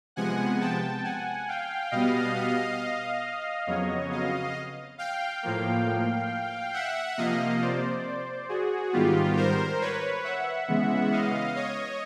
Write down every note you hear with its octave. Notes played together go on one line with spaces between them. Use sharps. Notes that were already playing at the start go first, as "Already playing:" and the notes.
C3 F3 G#3 B3 F#5 G#5
G5 A5
F#5 G#5
F5 G5
B2 G3 B3 D#5 F5
F2 C#3 F#3 B3 C#5 D#5
D#5 F5
F5 G5
A2 F3 A#3
E5 F#5
C3 F3 A#3 D#5 F5
C5 D5
F#4 G#4
G#2 D#3 G3 B3 F4 G4
A#4 C5
B4 C#5
E5 F#5
C#3 E3 G#3 B3
D#5 F5
C#5 D#5